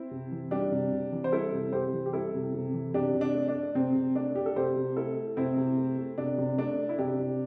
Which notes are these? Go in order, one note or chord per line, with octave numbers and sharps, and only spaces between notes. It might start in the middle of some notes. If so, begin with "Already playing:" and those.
Already playing: C4 E4
C3
E3
G3 D4 G4
C3
C3
E3
C5
G3 E4 A4
C3
C3 G4 C5
E3
G4
G3 E4 A4
C3
C3
E3
C3 D4 G4
C3
D4
A3
D4
A3
C3 C4
C3
A3 D4
A3 G4
A4
C3 G4 C5
C3
A3 E4 A4
A3
C3 C4 E4
C3
A3
A3
C3 D4
C3
A3 D4
A3
E4
C3 D4 G4
C3